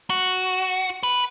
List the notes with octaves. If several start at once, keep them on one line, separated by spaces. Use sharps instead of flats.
F#4
B4